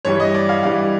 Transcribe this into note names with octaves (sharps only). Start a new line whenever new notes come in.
G2 E3 G3 C#5
D#5
D5
F5
G2 E3 G3 F5